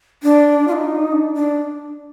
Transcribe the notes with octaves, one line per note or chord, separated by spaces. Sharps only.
D4
F4
D#4
D4
D4